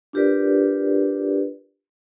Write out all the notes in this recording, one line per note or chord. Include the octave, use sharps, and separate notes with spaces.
D4 F4 G4 A#4 B4 D5